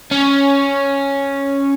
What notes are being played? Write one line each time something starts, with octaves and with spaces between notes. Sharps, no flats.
C#4